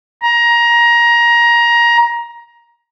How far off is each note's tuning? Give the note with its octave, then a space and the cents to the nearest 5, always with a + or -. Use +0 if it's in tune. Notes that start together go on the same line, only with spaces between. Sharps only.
A#5 +20